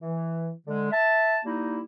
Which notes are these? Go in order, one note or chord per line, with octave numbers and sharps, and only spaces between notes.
E3
D3 G#3
E5 A5
G3 A#3 D#4 E4